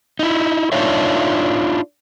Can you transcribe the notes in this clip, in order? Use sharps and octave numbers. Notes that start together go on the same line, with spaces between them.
D#4 E4
D4 D#4 F4 C#5 E5